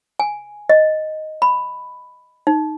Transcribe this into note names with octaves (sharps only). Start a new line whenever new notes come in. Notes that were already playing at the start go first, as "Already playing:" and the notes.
G#5
D#5
B5
D#4